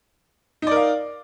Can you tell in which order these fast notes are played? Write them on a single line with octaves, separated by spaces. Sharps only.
D#4 D5 A#4 F5